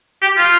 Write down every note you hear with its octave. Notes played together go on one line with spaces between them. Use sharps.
G4
F4